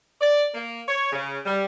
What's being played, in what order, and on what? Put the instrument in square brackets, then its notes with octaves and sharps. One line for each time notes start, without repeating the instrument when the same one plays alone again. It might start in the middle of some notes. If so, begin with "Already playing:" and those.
[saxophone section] D5
A#3
C#5
C#3
G3